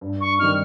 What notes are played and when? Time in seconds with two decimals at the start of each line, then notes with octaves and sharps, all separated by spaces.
0.01 G2
0.21 C#6
0.39 D#3 G3 C4 D#4 F6